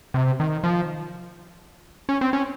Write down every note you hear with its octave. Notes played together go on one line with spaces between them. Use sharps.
C3
D#3
F3
C#4
C4
C#4